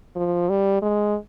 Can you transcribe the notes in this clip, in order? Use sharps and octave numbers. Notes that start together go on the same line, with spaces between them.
F3
G3
G#3